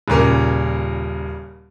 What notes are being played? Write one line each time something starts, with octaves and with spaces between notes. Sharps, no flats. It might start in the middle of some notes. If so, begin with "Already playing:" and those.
D#1 A#2 C#3 A#4